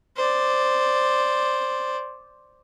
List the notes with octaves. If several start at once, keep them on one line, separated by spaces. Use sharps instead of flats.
C5 D5